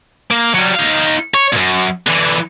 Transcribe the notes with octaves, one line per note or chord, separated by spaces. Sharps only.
A#3
F#3 G3
D#4 F5
C#5
F#2 A#2
D3 E3